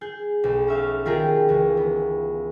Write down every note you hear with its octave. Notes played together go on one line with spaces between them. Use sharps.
G#4 G6
B1
C#4 E5 F5
D#3 F4 G4 G#4 A#4
C#2 E3
B3